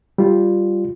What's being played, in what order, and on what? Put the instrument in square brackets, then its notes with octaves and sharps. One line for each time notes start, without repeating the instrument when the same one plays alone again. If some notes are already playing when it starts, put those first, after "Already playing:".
[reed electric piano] G3 F4